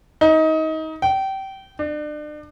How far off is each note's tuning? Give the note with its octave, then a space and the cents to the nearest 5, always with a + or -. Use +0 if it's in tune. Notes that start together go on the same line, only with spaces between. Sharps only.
D#4 +25
G5 -25
D4 +35